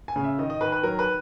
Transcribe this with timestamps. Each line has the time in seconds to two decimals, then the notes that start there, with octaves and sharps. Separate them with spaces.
0.08 G#5
0.16 C#3
0.24 E5
0.39 D#3 D#5
0.50 D#5
0.61 D#3 B4
0.72 B4
0.83 F#3 A#4
0.99 B4